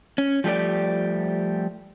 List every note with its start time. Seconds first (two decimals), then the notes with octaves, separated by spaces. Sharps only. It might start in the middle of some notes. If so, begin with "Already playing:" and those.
0.18 C#4
0.44 F3 G3 A3 G4 D5